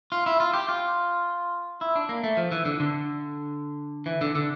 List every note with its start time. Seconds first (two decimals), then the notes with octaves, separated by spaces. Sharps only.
0.12 F4
0.26 E4
0.40 F4
0.54 G4
0.69 F4
1.81 E4
1.96 D4
2.09 A#3
2.24 A3
2.37 F3
2.52 E3
2.65 D3
2.80 D3
4.06 E3
4.21 D3
4.35 D3